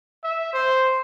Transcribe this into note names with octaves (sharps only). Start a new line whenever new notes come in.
E5
C5